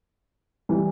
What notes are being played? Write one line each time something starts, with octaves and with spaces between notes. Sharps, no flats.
E3 G3